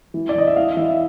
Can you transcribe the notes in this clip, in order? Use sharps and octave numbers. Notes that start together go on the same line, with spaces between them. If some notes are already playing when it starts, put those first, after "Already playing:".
E3
D5
E3 D#5
E5
E3 F5
E3 E5